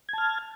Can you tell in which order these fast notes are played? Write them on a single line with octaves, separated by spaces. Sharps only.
G#6 A5 F6